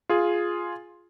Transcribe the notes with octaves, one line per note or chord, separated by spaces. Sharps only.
F4 G#4